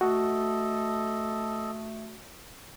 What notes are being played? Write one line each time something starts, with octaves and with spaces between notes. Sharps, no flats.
A3 F#4 A4 D#5